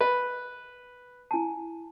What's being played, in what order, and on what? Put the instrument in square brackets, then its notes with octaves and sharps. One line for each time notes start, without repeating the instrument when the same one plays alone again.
[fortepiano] B4 [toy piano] D#5
[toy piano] E4 G#5 A5